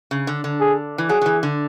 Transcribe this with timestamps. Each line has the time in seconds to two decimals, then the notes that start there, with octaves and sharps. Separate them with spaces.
0.11 C#3
0.27 D3
0.44 D3
0.60 G#4
0.98 E3
1.09 F#3 G#4
1.21 F#3
1.26 E3
1.43 D3